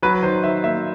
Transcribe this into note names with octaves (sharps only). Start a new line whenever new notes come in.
F#3 B4
D#3 C5
D#3 E5
A#3 E5